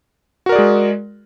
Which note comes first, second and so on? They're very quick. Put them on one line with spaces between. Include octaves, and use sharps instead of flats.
F#4 A#4 D5 G#4 G#3